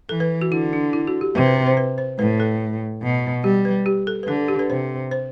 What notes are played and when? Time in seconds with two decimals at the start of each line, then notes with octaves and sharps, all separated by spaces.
0.09 E3 A4
0.20 B4
0.41 F#4
0.51 D3 E4
0.73 D4
0.93 E4
1.07 F#4
1.21 G4
1.35 C3 B4
1.46 B4
1.56 C5
1.67 C5
1.77 B4
1.98 C5
2.19 A2 B4
2.40 A4
3.02 B2
3.44 G3 G4
3.65 B4
3.86 G4
4.07 A4
4.23 B4
4.28 D3 A4
4.48 G4
4.59 B4
4.70 C3 C5
5.11 C5